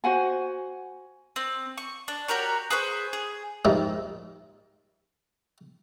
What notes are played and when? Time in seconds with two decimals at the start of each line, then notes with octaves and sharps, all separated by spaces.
0.04 F#4 C5 F#5 G#5
1.36 C4
1.78 C#6
2.08 D4
2.28 F#4 G4 A#4 C#5
2.70 G#4 B4 C5 C#6
3.13 G#4
3.65 G#2 F3 G3 A#4 E5